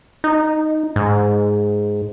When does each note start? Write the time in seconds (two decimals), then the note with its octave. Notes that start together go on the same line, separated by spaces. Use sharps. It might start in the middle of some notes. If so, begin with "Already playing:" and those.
0.24 D#4
0.96 G#2